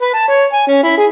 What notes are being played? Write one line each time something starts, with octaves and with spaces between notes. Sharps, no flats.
B4
A5
C#5
G#5
C#4
E4
G#4